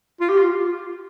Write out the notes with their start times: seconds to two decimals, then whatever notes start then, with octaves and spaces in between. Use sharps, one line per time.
0.20 F4
0.29 G4
0.39 F4